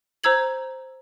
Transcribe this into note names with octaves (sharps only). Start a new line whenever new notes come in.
C5 A#5 E6 G#6 F#7